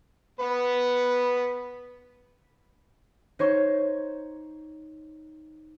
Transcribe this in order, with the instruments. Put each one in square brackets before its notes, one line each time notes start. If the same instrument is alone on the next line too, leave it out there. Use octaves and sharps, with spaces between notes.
[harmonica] B3 B4
[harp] D#4 C5 C#5 C#6